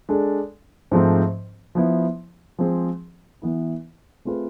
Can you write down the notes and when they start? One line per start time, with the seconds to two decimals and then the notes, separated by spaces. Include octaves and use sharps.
0.09 G#3 D4 A4
0.91 G#2 F3 A3 C4
1.75 F3 B3 E4
2.59 F3 G#3 C4 G#4
3.42 E3 B3 E4
4.25 A3 C4 F4 G#4 B4